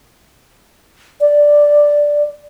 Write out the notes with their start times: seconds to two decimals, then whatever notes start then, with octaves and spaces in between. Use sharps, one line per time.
1.21 D5